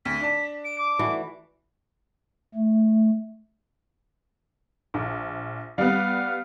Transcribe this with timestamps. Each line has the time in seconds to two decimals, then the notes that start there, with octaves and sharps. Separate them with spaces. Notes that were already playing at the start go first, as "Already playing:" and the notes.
0.05 D2 B6
0.20 D4 A5
0.65 D7
0.78 D6
0.99 E3 A3 F#4
2.54 A3
4.94 A#1
5.78 G3 B3 F5